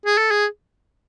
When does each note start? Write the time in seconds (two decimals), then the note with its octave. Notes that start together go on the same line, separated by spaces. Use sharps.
0.06 G#4
0.18 A4
0.31 G#4